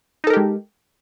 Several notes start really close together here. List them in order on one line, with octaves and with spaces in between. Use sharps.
D#4 A4 A#4 G4 G#3